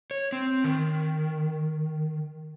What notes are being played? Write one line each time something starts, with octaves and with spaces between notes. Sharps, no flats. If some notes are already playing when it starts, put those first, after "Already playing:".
C#5
C4
D#3